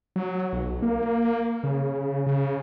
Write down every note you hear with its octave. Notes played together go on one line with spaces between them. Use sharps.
F#3
B1
A#3
C#3
C#3